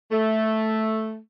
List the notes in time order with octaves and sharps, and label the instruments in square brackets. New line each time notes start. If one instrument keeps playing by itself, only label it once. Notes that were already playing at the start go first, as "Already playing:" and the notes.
[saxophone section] A3